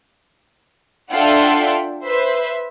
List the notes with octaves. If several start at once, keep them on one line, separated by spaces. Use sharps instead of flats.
D4 F4 A4 E5 F#5 G5
B4 C5 E5